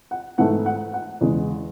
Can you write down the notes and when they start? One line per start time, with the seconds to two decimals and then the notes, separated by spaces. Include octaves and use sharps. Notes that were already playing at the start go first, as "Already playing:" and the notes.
0.11 F#5
0.38 G#2 E3 A3 F#5
0.66 F#5
0.94 F#5
1.21 E2 C#3 G#3